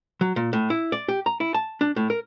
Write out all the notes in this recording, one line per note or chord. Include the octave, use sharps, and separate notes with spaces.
F#3
A#2
A2
E4
D5
G4
A#5
E4
A5
D4
A2
A#4